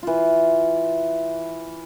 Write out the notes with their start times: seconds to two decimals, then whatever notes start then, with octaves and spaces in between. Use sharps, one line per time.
0.03 E3 F4